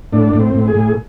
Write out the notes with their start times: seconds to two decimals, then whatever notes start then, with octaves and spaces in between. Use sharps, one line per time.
0.12 A2 D4
0.33 A2
0.40 C4
0.54 A2
0.68 G#4
0.75 A2